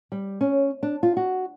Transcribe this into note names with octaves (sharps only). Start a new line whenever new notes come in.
G3
C#4
D4
F4
F#4